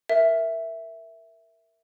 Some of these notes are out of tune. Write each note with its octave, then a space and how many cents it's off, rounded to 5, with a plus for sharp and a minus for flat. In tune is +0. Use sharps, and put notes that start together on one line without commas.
A#4 +0 E5 +0